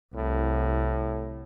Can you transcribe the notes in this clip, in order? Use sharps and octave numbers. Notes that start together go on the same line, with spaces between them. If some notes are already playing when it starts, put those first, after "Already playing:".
C2 A2